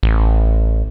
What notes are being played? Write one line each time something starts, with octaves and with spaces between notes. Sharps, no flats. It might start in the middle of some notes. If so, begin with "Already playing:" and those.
A1